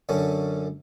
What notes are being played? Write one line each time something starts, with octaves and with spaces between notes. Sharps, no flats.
F#2 D3 C#4